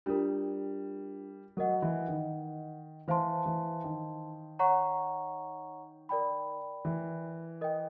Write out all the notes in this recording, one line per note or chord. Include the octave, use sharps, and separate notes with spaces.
G3 D4 F4 A#4
F#3 A#4 D#5 F#5
E3
D#3
E3 C5 F5 A5 C6
E3
D#3
C#5 F#5 A#5 C#6
A#4 D5 G5 B5
E3
A#4 D#5 G5